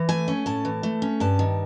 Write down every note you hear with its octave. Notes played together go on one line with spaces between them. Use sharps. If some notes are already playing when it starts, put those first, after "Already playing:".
Already playing: E3
A3 G#5
C#4
A2 A5
E3
A3
C#4
G2 A5
D#3